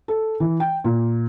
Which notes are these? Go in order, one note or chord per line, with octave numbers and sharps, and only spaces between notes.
A4
E3
G5
A#2